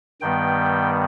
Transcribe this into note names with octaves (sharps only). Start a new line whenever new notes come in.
G2 D#3 G3 B3 G5